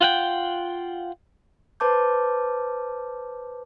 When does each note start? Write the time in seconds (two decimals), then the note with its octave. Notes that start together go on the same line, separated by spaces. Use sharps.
0.01 F4 F#5 G5
1.80 B4 C5 A5 D6 G6